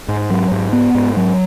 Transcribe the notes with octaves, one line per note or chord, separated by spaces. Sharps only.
G#2
F#3
G#2
B3
G#2
F#3